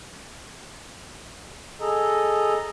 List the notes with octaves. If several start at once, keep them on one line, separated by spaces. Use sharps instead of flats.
G#4 A4 D#5 A#5